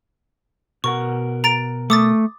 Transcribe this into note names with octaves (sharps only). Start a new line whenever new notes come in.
B2 A#4 F#5 C#6
A#5 A6 D7
A3 D6 D#6 A6